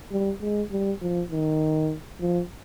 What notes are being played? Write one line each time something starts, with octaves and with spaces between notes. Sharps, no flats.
G3
G#3
G3
F3
D#3
F3